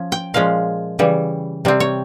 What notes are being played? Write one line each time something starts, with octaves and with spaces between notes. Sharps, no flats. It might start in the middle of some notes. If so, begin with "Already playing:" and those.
Already playing: F3 C#4
G5
A#2 F3 G#3 C#4 F5
C#3 E3 G3
C3 G3 C4
C#5